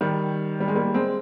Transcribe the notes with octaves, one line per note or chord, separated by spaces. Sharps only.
D#3 G3
G3
G#3
G3 A#3
G#3 C4